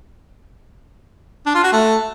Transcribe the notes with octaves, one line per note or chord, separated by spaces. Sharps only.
D4
F4
F#4
A3